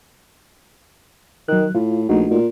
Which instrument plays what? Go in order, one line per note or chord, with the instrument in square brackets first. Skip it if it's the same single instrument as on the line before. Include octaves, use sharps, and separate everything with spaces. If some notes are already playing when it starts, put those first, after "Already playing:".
[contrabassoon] D#3 [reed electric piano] F#3 F#6
[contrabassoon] A2 [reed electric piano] F4
[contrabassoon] A#1 [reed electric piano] A3 D#4 F#4
[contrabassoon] A#2